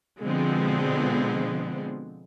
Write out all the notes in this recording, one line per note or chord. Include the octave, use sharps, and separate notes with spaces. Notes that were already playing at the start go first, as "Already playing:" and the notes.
B2 D3 F3 G#3 B3 C4